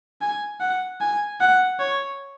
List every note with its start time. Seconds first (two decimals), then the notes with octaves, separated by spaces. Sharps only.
0.21 G#5
0.60 F#5
1.01 G#5
1.41 F#5
1.80 C#5